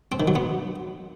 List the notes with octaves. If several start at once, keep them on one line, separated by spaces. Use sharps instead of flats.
C4
D#3
F#3
B3